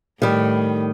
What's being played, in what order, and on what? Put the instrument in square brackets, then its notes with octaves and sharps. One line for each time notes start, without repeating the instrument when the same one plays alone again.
[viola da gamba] A2 [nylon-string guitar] D#3 G3